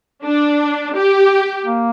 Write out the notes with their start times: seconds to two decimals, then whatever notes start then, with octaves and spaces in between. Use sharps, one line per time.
0.23 D4
0.95 G4
1.66 A#3